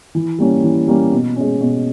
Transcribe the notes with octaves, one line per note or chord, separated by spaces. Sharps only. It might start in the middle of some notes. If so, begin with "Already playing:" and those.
E3
G3 A#3 C#4
E3
G3 A#3 C#4
B2
G#3 C#4
B2